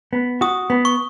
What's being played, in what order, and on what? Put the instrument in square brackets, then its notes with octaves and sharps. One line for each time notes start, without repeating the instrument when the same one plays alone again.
[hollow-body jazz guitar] B3
[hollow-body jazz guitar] F#4 [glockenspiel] D#6
[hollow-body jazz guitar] B3
[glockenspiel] C#6